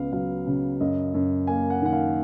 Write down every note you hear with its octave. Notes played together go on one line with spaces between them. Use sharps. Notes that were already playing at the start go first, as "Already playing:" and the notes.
Already playing: C#2 B3 F5
F#3 F5
C#3
F#2 D#5
F#2
A#3 G#5
F#5
D#3 F#5
F5